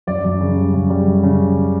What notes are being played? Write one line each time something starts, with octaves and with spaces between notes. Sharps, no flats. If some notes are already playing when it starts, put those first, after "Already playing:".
F#2 D5
F#2
C#3
G3
C#3
G3
F#2
C#3